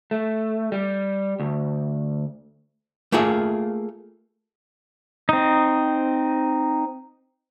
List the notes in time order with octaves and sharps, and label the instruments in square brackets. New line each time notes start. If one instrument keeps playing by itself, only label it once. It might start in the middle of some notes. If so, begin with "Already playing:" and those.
[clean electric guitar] A3
G3
D2
[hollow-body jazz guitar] A3 A#3 F4 G#4 E5
[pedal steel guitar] C4 D#4